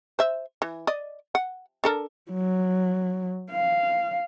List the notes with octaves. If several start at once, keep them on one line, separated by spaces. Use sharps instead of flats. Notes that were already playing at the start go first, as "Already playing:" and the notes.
C5 E5
E3
D5 D#5
F#5
D4 A4 A#4
F#3
F5